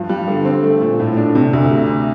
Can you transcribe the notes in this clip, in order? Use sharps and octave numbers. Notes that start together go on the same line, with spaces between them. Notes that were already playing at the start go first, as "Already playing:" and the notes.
Already playing: G2 F3
G3
D3
C4
A3
A#2
A2
D4
C3
D2
C3